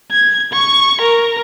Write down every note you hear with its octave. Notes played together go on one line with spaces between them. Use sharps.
G#6
C#6
A#4